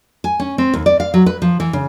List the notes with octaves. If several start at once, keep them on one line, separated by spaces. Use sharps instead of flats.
G#5
C#4
C4
D#2
D5
F5
F#3
B4
F3
E3
C#3